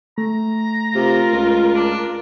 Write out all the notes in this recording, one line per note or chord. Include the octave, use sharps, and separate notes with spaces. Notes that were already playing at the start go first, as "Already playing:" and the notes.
A3 A#5
C3 F4 A#4
C#2
D4